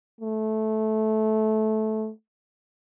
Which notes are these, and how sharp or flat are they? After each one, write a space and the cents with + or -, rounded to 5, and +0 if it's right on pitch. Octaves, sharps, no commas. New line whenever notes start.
A3 -15